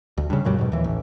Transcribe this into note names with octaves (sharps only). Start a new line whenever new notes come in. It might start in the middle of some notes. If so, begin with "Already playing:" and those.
D2
G2 C#3
F2 A#2 F#3 G3
G#2 B2
D#2 E3
A1